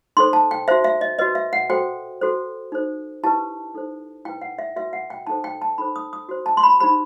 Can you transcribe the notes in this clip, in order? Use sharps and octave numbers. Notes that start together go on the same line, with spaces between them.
D#4 A4 C5 C6
A5
G5
F#4 C5 E5
E5
D#5
F#4 B4 D#5
E5
F#5
F#4 A4 C5 G5
F#4 A4 C5
D#4 A4 C5
E4 G4 B4 A5
D#4 A4 C5
E4 B4 G5
F#5
E5
F#4 B4 E5
F#5
G5
D#4 A4 C5 A5
G5
A5
D#4 A4 C5 B5
D#6
D#6
F#4 C5
A5
C6
B5
D#4 G4 C5 B5